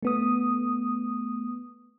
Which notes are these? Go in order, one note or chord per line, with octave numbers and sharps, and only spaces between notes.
A3 B3 D#6